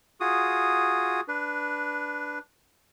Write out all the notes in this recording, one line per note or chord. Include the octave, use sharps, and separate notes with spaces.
F4 F#4 G#4 D#6
D4 B4